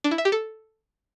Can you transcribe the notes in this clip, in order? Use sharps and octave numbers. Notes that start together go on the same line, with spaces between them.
D4
E4
E5
G4
A4